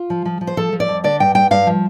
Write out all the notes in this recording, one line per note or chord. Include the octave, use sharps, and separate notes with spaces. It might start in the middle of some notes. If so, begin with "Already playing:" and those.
Already playing: F4
F3
F3
F3
C5
F3 A4
F3
D5
F2
D3 D5
G2 G5
G2 G5
G2 F5
F3